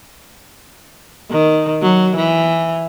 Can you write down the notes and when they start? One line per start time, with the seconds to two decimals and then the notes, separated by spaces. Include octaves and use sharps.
1.30 D#3
1.82 F#3
2.16 E3